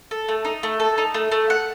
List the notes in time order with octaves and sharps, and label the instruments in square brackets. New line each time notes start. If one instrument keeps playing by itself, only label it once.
[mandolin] A4
A3
D#4
A3
A4
D#4
A3
A3
F#5